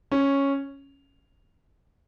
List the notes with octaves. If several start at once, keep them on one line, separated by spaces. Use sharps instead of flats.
C#4